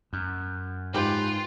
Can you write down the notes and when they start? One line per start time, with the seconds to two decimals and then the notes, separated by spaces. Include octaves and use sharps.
0.13 F#2
0.94 G#2 F4 G4 B4 G5